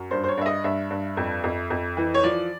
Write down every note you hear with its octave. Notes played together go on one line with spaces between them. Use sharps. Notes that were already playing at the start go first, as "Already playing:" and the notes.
Already playing: F#2
G2 C5
C5
C#5
G2 E5
D#5
G2 E5
G2
F2
F2
F2
E3
C#5
F3 D5